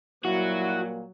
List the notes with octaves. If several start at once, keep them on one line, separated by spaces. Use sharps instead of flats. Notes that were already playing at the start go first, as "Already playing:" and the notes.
A#2 F#3 G3 A#3 E4 F#4